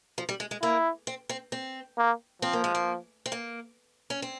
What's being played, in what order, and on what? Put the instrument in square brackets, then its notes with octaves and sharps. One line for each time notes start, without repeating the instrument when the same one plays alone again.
[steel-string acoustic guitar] F3
G3
G#3
G#3
[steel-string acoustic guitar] A#3 [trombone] E4
[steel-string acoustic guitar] C4
C4
C4
[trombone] A#3
[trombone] F3 [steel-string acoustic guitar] C4
[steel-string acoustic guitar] A#3
G#3
A#3
C4
A#3
C#4
C4